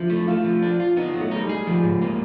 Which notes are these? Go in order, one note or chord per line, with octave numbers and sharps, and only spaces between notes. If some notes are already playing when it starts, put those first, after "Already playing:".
Already playing: F3 D4 E4
A3
A3 F4
F3
D4
F4
B3 D#4
F#3
A3
D#4
G3
G#3
G#4
F3
G#2
A#3